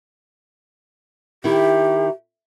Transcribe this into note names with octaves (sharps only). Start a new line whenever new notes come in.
D#3 E4 G4